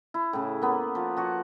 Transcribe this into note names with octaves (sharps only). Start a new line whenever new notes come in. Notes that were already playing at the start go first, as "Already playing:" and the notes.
E4
A2 C#3
A#3 B3
F3
F3 F#4 C#5